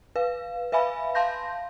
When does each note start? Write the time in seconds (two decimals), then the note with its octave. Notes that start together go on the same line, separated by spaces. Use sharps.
0.16 B4 F5
0.72 B4 E5 F5 G#5 B5
1.15 F5 A5 C6 G6 A#6